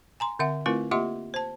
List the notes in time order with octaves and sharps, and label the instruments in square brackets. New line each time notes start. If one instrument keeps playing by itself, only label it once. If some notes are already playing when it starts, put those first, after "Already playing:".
[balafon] G#5 A#5 C6
D3 C4 E5 F#5
A3 C4 E4 F4 A#4 B4
A#3 F4 G4 D#5 E5 C6
C5 A5